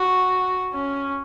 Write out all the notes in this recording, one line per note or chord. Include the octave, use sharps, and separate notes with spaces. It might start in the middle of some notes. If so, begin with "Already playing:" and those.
Already playing: F#4
C#4